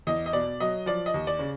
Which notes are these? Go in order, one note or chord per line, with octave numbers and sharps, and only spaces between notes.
E2 D#5
D#5
B2 D5
F#3 D#5
F3 D5
D#5
D#2
D5
C#3